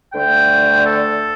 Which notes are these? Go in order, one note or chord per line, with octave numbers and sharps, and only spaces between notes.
D2 D3 A3 G5
A4